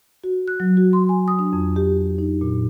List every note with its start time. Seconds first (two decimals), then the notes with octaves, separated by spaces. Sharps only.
0.24 F#4
0.48 F#6
0.60 F#3
0.77 F#4
0.93 C6
1.09 G#5
1.28 D#6
1.39 D4
1.53 F2
1.76 G4
2.19 D#4
2.41 A#2